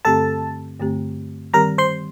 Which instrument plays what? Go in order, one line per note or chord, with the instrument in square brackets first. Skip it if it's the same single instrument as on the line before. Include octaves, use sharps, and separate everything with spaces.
[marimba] G2 D3 A3 C4 G4 [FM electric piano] A4 A5
[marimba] G2 D3 A3 C4 G4
[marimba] D#3 G3 C4 G4 [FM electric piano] A#4 A#5
[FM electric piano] C5 C6